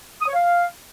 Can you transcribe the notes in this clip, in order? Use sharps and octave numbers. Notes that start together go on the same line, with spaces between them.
D#6
C#5
F5